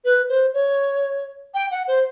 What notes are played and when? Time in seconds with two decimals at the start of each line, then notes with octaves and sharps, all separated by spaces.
0.04 B4
0.29 C5
0.54 C#5
1.54 G5
1.71 F#5
1.87 C5